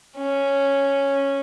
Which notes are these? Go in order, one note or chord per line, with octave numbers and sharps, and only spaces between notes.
C#4